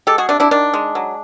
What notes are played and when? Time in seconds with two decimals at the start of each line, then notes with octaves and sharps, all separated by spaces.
0.07 G#3 G4 A4
0.18 F#4 G#4
0.29 C3 D4
0.40 D4 E4
0.51 D#3 D4
0.74 G#3
0.95 F#3